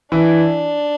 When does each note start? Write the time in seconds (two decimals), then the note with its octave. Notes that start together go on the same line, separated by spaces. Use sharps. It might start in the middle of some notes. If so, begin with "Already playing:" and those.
0.12 E3 D4 E4